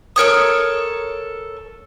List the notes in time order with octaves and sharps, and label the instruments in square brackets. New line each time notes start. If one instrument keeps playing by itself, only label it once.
[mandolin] A4 A#4 C#5 D#6